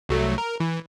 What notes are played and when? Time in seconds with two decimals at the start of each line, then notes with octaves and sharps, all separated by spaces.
0.09 C2 F#3 A3
0.38 A#4
0.60 E3